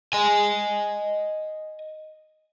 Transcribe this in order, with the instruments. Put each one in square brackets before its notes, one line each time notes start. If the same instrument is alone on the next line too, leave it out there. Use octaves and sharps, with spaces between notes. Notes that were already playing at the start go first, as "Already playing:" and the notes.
[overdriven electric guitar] D#5 G#5